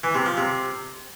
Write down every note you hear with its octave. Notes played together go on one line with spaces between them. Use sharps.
E3
C3
F3
C3